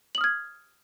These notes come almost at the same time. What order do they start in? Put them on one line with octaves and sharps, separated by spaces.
F#7 D#6 F6 G#6